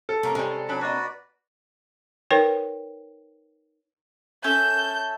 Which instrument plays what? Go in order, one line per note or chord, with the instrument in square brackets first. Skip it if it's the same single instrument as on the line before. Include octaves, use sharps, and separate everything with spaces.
[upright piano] A4
[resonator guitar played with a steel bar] C3 A#3 A#4 [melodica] C#4 [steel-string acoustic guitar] A#5
[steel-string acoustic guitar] C3 [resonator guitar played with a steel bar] G3 G#3
[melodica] F#3 B5 [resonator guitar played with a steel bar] D4 A5
[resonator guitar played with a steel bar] A#3 D#5 [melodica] F#4 B4 D5
[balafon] D#4 A#4 B4 C#5 G5
[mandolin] C#4 A4 E5 [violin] G6